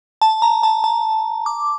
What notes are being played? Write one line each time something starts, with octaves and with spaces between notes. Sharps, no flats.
A5
A#5
A5
A5
D6